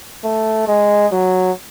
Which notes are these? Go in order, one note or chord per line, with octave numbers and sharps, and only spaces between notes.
A3
G#3
F#3